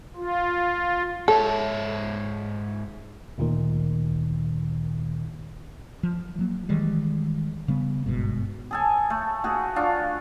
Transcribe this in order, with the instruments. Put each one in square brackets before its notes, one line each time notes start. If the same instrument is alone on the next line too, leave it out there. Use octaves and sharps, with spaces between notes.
[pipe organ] F4
[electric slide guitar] G#2 C#5 E5 [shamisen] A4
[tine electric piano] D2 A#2 D#3
[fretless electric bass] F3
F#3 A#3
D#3 E3 G3 G#3
C#3 G3 B3
G1 G#2 B2
[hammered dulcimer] G#4 A4 G#5
A3
A3 F#4 G#4
D4 F4 F#4